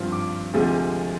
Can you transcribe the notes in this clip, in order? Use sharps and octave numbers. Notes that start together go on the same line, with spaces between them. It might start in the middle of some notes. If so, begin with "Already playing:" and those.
Already playing: G#1 G2 F3 C4 F4
D6
D2 C3 F3 G#3